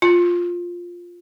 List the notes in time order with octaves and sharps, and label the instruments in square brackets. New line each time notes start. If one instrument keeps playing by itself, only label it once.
[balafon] F4